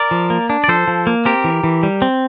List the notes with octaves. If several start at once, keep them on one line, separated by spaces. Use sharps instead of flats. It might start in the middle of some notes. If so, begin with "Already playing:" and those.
Already playing: A#4 D5
F3
A#3
D4
D5
F3 A4 C5
F3
A#3
C4 G4 A#4
E3
E3
G3
C4